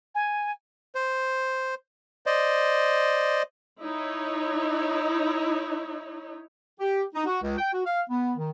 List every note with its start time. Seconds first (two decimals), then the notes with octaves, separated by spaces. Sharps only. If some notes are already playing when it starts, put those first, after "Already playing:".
0.15 G#5
0.95 C5
2.26 C5 D5 D#5
3.82 D#4 E4 C#5
6.79 G4
7.13 D#4
7.26 F#4
7.41 C#2
7.58 G5
7.73 F#4
7.86 F5
8.09 B3
8.37 D#3